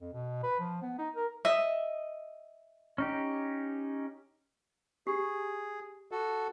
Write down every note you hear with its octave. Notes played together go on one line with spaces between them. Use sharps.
F2
B2
B4
F3
B3
D#4
A#4
D#5 E5
C#4 D#4 G4
G4 G#4
F#4 A4